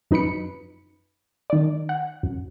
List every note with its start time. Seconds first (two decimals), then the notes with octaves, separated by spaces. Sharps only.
0.11 F#2 D#4 B4 B5 C#7
1.50 D#3 D5
1.89 F#5
2.23 F#2